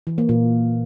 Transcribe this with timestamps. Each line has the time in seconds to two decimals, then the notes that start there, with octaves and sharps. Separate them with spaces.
0.07 E3
0.18 A#3
0.29 A#2